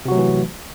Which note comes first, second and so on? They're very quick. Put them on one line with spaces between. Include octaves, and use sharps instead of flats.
C3 F#4 F#3 A3 E3